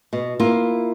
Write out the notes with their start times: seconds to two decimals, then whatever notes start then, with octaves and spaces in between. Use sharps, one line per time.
0.13 B2
0.39 A#3 E4 F4